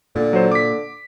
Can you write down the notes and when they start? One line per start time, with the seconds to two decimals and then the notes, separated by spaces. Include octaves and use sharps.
0.16 A#2 D3
0.33 F#3 C5
0.52 D6 B6